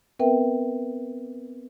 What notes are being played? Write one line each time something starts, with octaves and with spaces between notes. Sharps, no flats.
B3 C4 A#4 B4 E5 G5